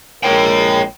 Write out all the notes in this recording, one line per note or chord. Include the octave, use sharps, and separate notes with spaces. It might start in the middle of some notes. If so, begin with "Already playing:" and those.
A#1 G#3 A#4 C#5 G5